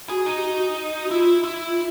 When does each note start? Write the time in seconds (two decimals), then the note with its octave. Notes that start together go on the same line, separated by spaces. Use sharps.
0.09 F#4 G#4
0.26 D#4
0.36 G4
0.43 F#4
1.04 F#4
1.10 E4 F4
1.44 E4
1.67 F4